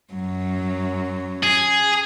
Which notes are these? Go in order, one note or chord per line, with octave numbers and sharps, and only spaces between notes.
F#2 F#3
G#4